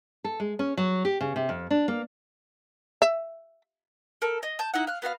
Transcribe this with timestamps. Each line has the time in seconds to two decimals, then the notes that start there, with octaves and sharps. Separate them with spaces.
0.24 A4
0.40 G#3
0.59 C#4
0.77 F#3
1.05 G4
1.21 C#3
1.36 C3
1.49 F2
1.71 D4
1.88 A#3
3.02 E5
4.22 A4 A#4
4.43 D#5
4.59 A5 G6
4.74 D#4 E4 F#5
4.87 F5 F#6
5.02 B3 F#4 C5 F5